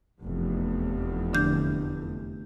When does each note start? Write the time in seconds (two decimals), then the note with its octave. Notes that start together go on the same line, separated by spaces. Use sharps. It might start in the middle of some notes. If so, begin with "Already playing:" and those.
0.19 F1 E2
1.33 D3 D4 G6